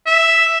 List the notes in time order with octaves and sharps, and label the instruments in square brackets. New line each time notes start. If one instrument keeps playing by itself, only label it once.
[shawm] E5